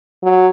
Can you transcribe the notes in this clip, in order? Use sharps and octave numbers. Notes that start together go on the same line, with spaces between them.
F#3